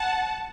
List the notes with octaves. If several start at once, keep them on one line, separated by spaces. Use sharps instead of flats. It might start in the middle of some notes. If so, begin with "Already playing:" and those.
Already playing: F#5 A5